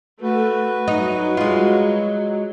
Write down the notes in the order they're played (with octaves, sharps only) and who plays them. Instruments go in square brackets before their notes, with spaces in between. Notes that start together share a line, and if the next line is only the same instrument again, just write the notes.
[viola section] A3 [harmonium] F#4 B4
[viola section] F#3 [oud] D#4
[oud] G#3 F4